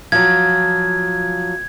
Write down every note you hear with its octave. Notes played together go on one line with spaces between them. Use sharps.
F3 F#3 G#6